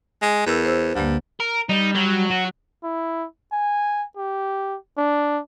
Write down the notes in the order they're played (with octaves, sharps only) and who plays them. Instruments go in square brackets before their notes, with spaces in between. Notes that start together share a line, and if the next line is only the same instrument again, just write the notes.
[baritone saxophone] G#3
[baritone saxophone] E2 [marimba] A#4 E6
[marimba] C5 E6
[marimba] D2 D3 A#3 [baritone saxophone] G2
[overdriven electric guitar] A#4
[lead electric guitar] G3 [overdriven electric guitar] D#4
[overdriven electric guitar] F#3
[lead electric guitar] F#4
[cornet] E4
G#5
G4
D4